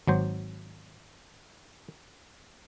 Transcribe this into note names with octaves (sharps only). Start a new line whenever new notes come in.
G#1 F#3 C5